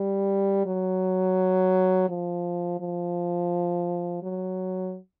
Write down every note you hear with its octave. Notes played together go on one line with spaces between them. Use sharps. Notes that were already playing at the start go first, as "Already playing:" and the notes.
Already playing: G3
F#3
F3
F3
F#3